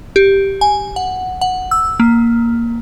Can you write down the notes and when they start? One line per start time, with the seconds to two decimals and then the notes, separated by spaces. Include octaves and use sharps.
0.16 G4
0.61 G#5
0.96 F#5
1.41 F#5
1.71 E6
2.00 A#3